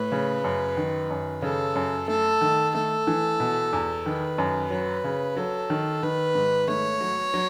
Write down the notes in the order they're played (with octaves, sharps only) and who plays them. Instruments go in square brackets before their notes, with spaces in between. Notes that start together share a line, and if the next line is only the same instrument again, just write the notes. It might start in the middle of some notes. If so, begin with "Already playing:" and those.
Already playing: [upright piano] A2 [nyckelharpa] B4
[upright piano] C#3
F#2
D#3
F#2
[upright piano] C#3 [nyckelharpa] A4
[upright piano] F#2
[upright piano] A3 [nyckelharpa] A4
[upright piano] D#3
[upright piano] A3 [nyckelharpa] A4
[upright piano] E3
B2
E2
[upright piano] D#3 [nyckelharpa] B4
[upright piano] F#2
[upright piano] F#3 [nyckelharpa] B4
[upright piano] C#3
[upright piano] F#3 [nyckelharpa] A4
[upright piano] D#3
[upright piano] D#3 [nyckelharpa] B4
[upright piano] G#2
[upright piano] A3 [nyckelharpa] C#5
[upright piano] F#3
F#3